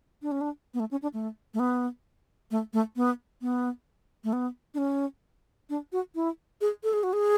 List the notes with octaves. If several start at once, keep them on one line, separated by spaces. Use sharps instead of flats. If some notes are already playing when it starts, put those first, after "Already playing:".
D4
C#4
D4
B3
A3
C#4
D4
A3
A3
B3
A3
A3
B3
B3
A3
B3
D4
C#4
D4
F#4
E4
G#4
A4
G#4
F#4
G#4